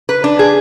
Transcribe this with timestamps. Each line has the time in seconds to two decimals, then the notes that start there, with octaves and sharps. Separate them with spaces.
0.09 B4
0.24 D4
0.39 G#4